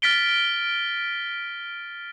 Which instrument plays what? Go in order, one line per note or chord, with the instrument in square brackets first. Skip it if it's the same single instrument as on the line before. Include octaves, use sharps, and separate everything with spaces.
[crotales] F6 A6 B6 D7 G7